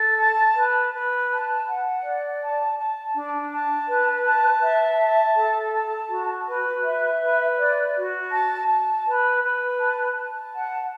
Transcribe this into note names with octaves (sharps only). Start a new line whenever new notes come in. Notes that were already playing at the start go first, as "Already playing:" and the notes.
Already playing: A4
A5
B4
B4
A5
F#5
D5
A5
A5
D4
A5
B4
A5
E5
A5
A4
A5
F#4
B4
E5
B4
D5
F#4
A5
A5
B4
B4
A5
A5
F#5